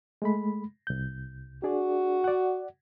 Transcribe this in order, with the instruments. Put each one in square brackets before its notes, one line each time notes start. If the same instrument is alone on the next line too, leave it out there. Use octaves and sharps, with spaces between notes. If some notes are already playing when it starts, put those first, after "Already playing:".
[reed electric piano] G#3 A3 B5
C2 G6
[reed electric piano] D4 G#4 D5 [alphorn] F#4
[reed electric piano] D5 F#5